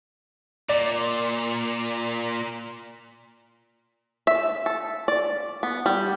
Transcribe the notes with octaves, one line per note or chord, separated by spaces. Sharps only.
A#2 D5
E5
A4
D5
B3
G3